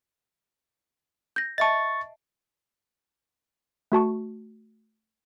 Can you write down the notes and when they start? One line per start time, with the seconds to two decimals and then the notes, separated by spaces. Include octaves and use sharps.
1.36 G6 A#6
1.58 D#5 E5 A5 C#6 A6
3.92 A3 F#4 A5 C#6